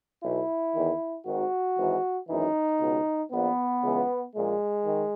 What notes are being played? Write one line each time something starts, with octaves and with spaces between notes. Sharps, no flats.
B1 B2 E4
E2 D#3
G#1 G#2 D#3 F#4
G#1 G#2 E3
G#1 F#2 E3 D#4
C#2 B2
A#1 A#2 B3
C#2 C#3 E3
A#1 A#2 G#3
D#3